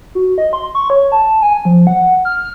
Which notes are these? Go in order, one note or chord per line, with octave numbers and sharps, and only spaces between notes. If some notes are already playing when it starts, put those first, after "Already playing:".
F#4
D#5
C6
C#6
C#5
A5
G#5
F3
F#5
F6